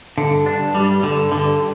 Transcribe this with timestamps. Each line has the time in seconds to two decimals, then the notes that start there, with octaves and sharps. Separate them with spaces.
0.17 G2 D3
0.46 D4
0.60 G2
0.75 G3
1.03 G2 D3
1.32 D3